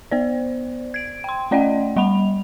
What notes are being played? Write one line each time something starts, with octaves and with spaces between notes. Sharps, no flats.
B3 C5 D5
G#6 D7
G5 C6
A3 C#4 D5 D#5 F#5 G5
G3 F#5 B5 F7